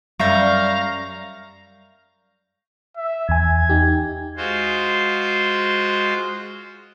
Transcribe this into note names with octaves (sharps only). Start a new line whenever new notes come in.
F#2 G3 E5 F5 A#5 C#6 G6
E5
E2 G#5 G#6
D#4 G4
G#3 F4 F#4 C5